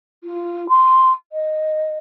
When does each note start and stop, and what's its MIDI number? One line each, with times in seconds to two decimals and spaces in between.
0.24 0.68 65
0.69 1.12 84
1.32 1.98 75